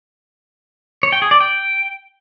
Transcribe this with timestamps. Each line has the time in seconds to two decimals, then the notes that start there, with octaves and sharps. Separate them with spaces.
1.03 C#5
1.12 G5
1.22 G#4
1.31 D5
1.40 G5